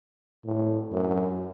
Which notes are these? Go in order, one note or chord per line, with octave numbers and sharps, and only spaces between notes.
A2
F#2